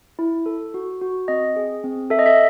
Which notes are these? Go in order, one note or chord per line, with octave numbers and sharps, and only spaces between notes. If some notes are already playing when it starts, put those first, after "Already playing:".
E4
A4
F#4
F#4
C4 D#5
G#4
C4
A4 E5
D#5
E5